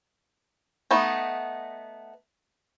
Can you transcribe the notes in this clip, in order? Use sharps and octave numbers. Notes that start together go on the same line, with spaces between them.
A3 B3 D#4